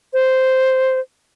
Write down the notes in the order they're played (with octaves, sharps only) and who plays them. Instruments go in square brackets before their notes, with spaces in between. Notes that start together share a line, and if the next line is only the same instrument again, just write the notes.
[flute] C5